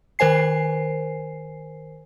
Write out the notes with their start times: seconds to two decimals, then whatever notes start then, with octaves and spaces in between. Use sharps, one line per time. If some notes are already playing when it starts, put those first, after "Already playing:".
0.19 D#3 A#4 C5 G#5 C7